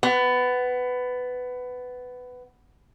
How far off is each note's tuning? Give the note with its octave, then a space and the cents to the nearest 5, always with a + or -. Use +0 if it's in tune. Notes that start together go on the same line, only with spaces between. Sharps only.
B3 +15